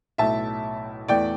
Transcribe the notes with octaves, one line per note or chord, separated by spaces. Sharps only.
B1 A2 A3 E5 A5
E2 E3 A3 D5 G5